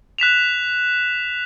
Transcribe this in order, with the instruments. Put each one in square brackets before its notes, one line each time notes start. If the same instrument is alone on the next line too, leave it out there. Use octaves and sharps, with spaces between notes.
[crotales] F#6 B6 E7 F7